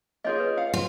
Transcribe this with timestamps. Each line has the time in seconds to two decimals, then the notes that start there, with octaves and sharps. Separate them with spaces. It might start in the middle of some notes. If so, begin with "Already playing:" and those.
0.25 A#3 F4 G#4 C#5 D#5
0.40 B4
0.57 F5 F#5
0.74 F4